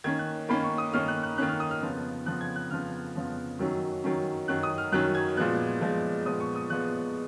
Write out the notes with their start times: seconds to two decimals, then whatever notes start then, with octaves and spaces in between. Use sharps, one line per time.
0.04 D#3 A#3 C#4 G#6
0.19 F#6
0.49 D#3 A#3 C#4 B5
0.63 C#6
0.78 D#6
0.93 D#3 A#3 C#4 F6
1.08 F#6
1.23 F#6
1.38 D#3 A#3 C#4 F#6
1.49 F6
1.60 D#6
1.71 F6
1.82 F2 C#3 F3 B3
2.26 F2 C#3 F3 B3 F#6
2.41 G#6
2.56 F#6
2.71 F2 C#3 F3 B3 F6
3.16 F2 C#3 F3 B3
3.59 F#2 D#3 F#3 C#4
4.04 F#2 D#3 F#3 C#4
4.48 F#2 D#3 F#3 C#4 F#6
4.63 D#6
4.78 F6
4.92 F#2 D#3 F#3 C#4 F#6
5.15 G#6
5.37 A#2 F3 G#3 B3 F#6
5.81 A#2 F3 G#3 B3
6.26 A#2 F3 G#3 B3 D#6
6.40 C#6
6.56 D#6
6.70 A#2 F3 G#3 B3 F#6